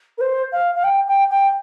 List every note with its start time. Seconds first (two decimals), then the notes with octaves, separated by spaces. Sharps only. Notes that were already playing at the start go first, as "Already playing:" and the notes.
0.18 A#4
0.21 C5
0.52 F5
0.75 F5
0.84 G5
1.08 G5
1.30 G5